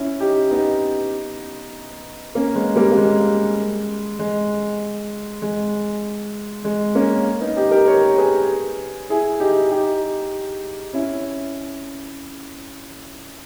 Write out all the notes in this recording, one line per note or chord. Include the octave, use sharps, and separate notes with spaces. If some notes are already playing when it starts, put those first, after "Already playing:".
Already playing: C#4 E4
D#4 G4
B3 D#4
A#3 C#4
G#3 B3
G3 A#3
A#3
G#3
G#3
G#3
G#3
A#3 C#4
B3 D#4
D#4 G4
G4 A#4
A#4 C#5
G#4 B4
E4 G#4
D#4 G4
D#4 G4
C#4 E4